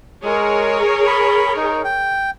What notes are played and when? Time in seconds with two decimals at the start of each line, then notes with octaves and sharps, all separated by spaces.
0.24 G#3 G#4 A#4 C#5
1.07 B5
1.56 D#4
1.85 G5